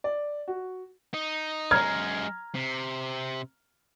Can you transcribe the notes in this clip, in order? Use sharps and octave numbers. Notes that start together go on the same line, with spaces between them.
D5
F#4
D#4
F#2 G#3 A#5 F6 G#6
C3